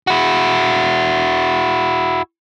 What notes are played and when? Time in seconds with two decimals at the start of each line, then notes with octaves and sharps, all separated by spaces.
0.07 E4 F#4